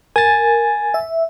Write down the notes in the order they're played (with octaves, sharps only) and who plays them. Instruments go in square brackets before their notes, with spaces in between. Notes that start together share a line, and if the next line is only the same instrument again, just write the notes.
[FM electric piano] A#4 [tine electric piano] G#5 A6
[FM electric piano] E5